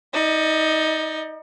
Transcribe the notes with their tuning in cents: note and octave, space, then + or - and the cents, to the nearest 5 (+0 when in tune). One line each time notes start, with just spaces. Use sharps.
D#4 +25 D5 +45